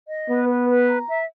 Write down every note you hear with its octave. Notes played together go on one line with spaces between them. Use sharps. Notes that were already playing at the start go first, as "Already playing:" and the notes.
D#5
B3 B4
B4
B4
A#5
E5